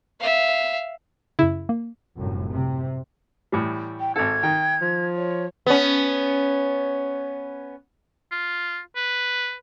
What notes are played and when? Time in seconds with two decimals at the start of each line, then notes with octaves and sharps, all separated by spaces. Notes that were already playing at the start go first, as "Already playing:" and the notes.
0.20 E5 F5
1.39 F#2 C#3 E4
1.69 A#3
2.17 F1 C2 F#2 A2
2.52 C3
3.52 A2 E3 G3
4.00 G5
4.16 G#1 A4 G#6
4.43 D#3 G5
4.81 F3
5.16 C#5
5.66 B3 C#4
8.32 F4
8.96 B4